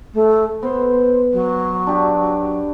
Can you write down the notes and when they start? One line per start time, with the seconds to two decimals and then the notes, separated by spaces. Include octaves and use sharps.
0.14 A3
0.63 B3 C5
1.33 F#3
1.87 D4 G4